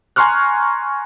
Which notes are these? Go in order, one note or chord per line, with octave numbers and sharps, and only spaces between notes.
G#5 A#5 C6 C#6 F6 F#6